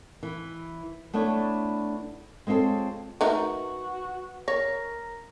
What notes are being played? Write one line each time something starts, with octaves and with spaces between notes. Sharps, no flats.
E3
A3 B3 D4 E4 C#5
G#3 C4 F4 A4 C#5
A3 D#4 F#4 A#4 B4
A#4 C#5 A#6